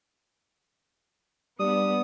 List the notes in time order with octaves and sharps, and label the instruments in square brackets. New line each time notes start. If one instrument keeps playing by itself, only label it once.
[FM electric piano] G3 [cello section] B3 [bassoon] D4 [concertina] D#6